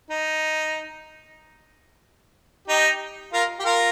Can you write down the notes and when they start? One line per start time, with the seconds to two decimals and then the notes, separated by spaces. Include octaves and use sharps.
0.11 D#4
2.68 D#4 G4
3.33 F4 A#4
3.60 G4
3.65 F4 A#4